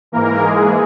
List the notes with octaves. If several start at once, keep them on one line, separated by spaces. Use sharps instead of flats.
G#2 E3 A#3 A#4
G#3 G#4